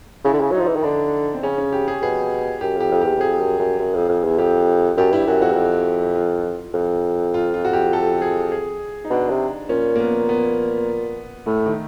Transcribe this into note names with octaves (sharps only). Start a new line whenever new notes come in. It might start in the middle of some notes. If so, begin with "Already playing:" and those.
C#3 E4
D3
C#3
F#3 D#4
F3
E3
D#3
D3 D4
C4
C#3 C#4
C#4
G4
G#4
B2 G#4
F#2 G4
F2 G4
F2
E2 G4
E2
F2 G#4
F#2
F#2
F#2
F2
F2
E2
F2 G4
F#2 G4
G2 E4
F#2 F#4
F2 F#4
E2
F2
F4
F2
F4
F4
F#4
G4
A4
G#4
G#4
D#4
B2 D4
C3
A#2 C#4
A#3
B3
B3
A2 A3
D#3